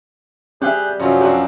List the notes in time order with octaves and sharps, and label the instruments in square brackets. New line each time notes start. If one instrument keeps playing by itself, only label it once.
[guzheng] G3 G4 [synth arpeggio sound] C4 E5 [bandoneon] G#4 F#6 G6
[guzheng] F#2 C3 C5 [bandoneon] F3 F#3 C#4
[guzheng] C4 D4 [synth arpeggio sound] F#4 F#5